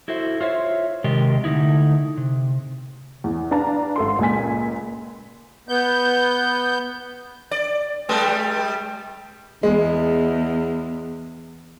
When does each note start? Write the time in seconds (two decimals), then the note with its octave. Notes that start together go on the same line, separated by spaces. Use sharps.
0.08 E4 F#4 A4 C5 E5
0.41 F4 C5 C#5 E5
1.04 C3 D#3 G#3 G4 A#4 D#5
1.44 D3 A3 D#4 E4
2.18 C3
3.24 E2
3.51 D4 B4 F5 A5 A#5
3.96 G#1 A4 C6
4.19 C#2 A#2 G#3 G#5 B6
5.69 B3 G6
7.51 D5
8.09 G3 G#3
9.63 E2 G#3